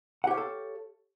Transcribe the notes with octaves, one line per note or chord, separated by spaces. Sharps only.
G4 A4 C#5 F5 F#5